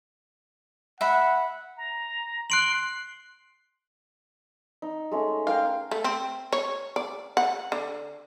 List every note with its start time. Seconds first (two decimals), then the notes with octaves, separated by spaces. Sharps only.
1.01 E5 F#5 B5
1.77 A#5
2.50 C6 F#6 D7 F#7
4.82 D#4
5.11 G#3 A3 C#4
5.47 A#4 F5 G5
5.91 A3
6.04 C4
6.53 C#5
6.96 D5
7.37 F#5
7.72 D3